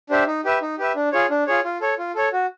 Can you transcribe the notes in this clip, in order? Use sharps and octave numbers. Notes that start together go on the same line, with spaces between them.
D4 G4 C5 E5
D#4
G4 B4 E5
D#4
G4 B4 E5
D4
F4 G#4 C#5
D4
F4 G#4 C#5
F4
A4 C#5
F4
A4 C#5
F#4